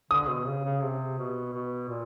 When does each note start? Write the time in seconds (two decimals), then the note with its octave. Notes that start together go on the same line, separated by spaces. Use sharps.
0.11 D3 D#6
0.29 B2
0.46 C#3
0.65 C#3
0.82 C3
1.18 B2
1.53 B2
1.89 A#2